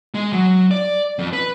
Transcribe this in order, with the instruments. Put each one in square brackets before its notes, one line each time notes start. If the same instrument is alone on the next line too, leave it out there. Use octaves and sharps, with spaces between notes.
[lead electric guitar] G#3
F#3
D5
F2
B4